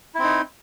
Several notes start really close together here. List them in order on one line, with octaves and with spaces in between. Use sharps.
E4 C4 D#4